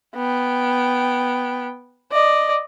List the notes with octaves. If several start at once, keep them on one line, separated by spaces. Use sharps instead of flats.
B3 G5
D5 D#5